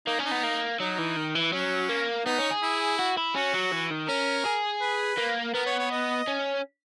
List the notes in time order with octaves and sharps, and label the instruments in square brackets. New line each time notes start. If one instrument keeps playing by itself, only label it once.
[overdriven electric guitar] A#3 [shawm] D#4
[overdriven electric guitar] C#4
[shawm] D#4
[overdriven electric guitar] B3
A#3
[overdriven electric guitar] F#3 [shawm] D#4
[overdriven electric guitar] E3
D#3
E3
[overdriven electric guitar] F#3 [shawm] C#4
[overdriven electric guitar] A#3
[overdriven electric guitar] B3 [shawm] D#4
[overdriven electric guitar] C#4
G#4
[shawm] E4
[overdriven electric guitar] F#4
E4
[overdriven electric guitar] C#4 [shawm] F#4
[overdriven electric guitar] F#3
E3
D#3
[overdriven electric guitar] C#4 [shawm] A#4
[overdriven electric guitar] G#4
[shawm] B4
[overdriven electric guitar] A#3
[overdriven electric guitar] B3 [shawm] A#4
[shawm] C#5
C#5
D#5
[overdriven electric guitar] C#4